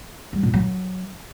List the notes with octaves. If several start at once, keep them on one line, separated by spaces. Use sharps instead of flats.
G3
A#2
F#3